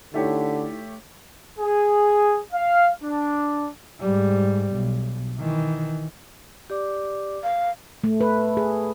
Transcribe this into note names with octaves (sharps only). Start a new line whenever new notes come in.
D3 A3 D#4 E4 G4 C#5
G#4
F5
D4
G#2 G3
B1
D#3 E3
G4 D5 D6
F5
A3
B4
G#4